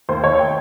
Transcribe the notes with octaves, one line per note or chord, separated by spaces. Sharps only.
D#2 C5
D#2 C#5
G5